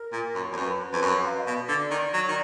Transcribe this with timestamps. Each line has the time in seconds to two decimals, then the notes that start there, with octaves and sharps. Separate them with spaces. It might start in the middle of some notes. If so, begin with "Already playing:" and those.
Already playing: A#4
0.13 A#2
0.35 F#2
0.51 F2 D5
0.57 F#2 B4
0.93 F2
1.02 F#2
1.15 F#5
1.26 F5
1.36 D#5
1.46 B2 D5
1.69 D3
1.91 D#3
2.14 F#3
2.28 D#3